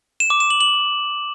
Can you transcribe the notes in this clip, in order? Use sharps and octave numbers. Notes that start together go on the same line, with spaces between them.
E7
D6
E7
F#7
F#7